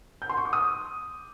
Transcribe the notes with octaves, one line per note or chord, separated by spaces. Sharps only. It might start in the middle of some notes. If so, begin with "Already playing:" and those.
G6
C6
C#6
D6
D#6